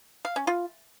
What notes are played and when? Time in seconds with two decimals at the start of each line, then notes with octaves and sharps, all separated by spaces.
0.25 F5
0.36 C#4
0.47 F4